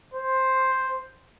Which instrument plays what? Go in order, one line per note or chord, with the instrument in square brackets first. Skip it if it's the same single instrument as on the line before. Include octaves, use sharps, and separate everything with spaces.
[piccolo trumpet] C5